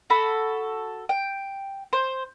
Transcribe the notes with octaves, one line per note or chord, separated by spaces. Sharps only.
F#4 A4 B5
G5
C5